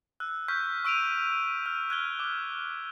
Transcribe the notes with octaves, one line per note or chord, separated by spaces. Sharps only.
E6 F#6
C#6 F6 G6 B6
C#6 E6 D7 D#7 F7
F6
F#6 G#6 G7
D6 F6